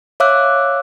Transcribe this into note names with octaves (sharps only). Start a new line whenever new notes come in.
C#5 E5 F5 D6 E6 F#6